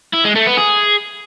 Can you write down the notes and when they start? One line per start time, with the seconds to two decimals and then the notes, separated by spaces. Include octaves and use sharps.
0.14 E4
0.25 G#3
0.35 A3
0.46 B3
0.57 G#4